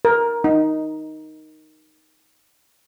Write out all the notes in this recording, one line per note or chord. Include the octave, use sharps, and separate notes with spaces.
A#4
D#4